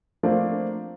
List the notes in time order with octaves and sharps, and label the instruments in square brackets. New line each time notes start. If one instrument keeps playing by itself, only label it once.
[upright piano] F3 A3 A#3 C4 D4